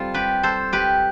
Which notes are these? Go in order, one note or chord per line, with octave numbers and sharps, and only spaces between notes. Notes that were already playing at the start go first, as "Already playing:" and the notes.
Already playing: G3 C4 F4 A4
G4 B4
A4 C5
G4 B4